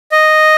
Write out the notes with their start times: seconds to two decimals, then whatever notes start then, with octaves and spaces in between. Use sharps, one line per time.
0.12 D#5